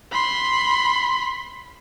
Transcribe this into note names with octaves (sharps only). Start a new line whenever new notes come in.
B5 C6